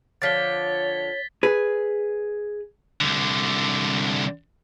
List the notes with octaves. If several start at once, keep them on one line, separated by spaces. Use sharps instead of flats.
D3 F3 C#5 A6 B6 G7
G#4 B4
C2 D3